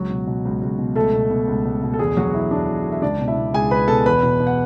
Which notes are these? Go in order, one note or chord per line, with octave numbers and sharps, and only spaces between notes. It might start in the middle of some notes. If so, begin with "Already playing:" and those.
Already playing: C#2 F#3 F#4
B2
B2
C#2
C#2
B2
C#2 A3 A4
B2
B2
C#2
C#2
B2
A4
E2 G#3 G#4
D3 F#3 F#4
D3 E4
E2 D4
E2
E4
D3
E5
C#2 D4 D5
B2
E4 E5
B2
C#2 G#4 G#5
C#2 B4 B5
B2 A4 A5
E2 B4 B5
B2
B2
F#5